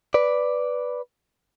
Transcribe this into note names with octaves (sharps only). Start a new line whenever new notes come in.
B4 D5